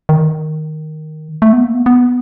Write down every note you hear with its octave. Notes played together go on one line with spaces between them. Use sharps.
D#3
A3
B3
A#3
B3
B3